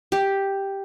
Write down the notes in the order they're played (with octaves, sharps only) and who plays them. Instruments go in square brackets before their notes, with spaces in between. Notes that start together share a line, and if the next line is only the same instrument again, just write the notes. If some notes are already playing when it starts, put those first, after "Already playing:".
[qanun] G4